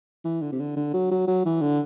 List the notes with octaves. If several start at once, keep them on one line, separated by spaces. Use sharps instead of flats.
E3
D3
C3
D3
D3
F#3
F#3
F#3
E3
D3